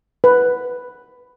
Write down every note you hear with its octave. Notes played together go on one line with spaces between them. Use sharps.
B4